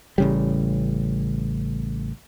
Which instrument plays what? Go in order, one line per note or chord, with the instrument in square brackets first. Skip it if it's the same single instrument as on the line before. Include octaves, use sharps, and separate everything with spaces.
[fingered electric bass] A1 C#3 G3